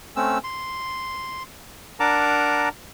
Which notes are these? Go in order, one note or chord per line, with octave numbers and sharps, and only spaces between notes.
A3 C4 C#4 E6
C6
D4 A#4 F#5 A5 A#5 D6